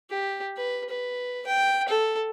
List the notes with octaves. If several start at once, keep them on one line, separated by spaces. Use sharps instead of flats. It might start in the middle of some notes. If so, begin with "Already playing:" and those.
G4
B4
B4
G5
A4